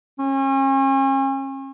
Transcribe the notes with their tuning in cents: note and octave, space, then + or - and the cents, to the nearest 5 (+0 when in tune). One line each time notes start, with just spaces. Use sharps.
C#4 -40